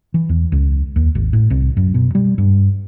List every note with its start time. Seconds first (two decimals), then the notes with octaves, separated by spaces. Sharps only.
0.14 E3
0.29 E2
0.52 C#2
0.96 D#2
1.15 G#1
1.33 A2
1.50 C2
1.77 F#2
1.94 B2
2.15 G3
2.38 G2